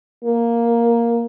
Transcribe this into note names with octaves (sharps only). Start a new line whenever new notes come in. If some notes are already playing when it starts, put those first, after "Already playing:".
A#3